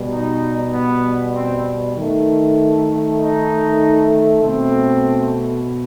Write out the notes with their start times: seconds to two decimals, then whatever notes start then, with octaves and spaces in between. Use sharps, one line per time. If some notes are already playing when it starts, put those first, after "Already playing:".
Already playing: B2 G3
0.11 D#4
0.72 B3
1.34 C4
1.95 D#3 A3
3.19 D#4
4.41 B2 A3 C4